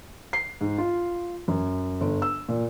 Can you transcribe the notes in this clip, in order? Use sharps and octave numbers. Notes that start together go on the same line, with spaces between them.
C7
G#2
F4
F#2
G1
E6
A#2